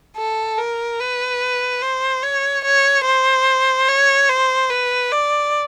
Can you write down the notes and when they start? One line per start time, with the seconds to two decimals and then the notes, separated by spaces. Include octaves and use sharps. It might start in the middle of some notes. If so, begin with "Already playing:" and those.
0.17 A4
0.58 A#4
1.00 B4
1.82 C5
2.23 C#5
2.65 C#5
3.05 C5
3.88 C#5
4.29 C5
4.70 B4
5.12 D5